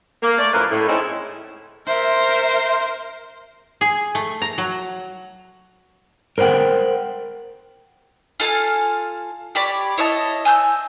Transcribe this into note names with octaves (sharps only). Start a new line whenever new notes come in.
A#3
A3 D5
F#2 A2 F3 A#3 A#4 B4
A2
A2 G#3 C4 C#4 D#4 E4
A#4 C5 E5
G#4
A3
A#5
F#3
A#4 C5 C#5 F#5 G5
F4 A4 F5 G#5
G4 C#5 D5 B5
E4 C#5 D#5 A5
G#5 E6 F#6 G6